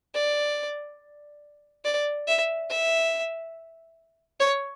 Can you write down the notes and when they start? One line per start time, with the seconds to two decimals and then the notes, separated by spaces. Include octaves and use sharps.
0.15 D5
1.85 D5
2.27 E5
2.70 E5
4.40 C#5